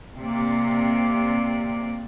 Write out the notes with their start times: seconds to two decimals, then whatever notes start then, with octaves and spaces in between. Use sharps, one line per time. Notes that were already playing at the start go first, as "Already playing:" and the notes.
0.16 C3 A#3 D5